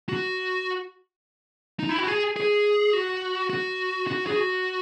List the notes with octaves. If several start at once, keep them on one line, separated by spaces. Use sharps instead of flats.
F#4
D#4
E4
F#4
G#4
G#4
F#4
F#4
F#4
G#4
F#4